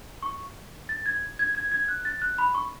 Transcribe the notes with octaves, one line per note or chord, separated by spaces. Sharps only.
C#6
A6
G#6
G#6
G#6
G#6
F#6
A6
F#6
B5
C#6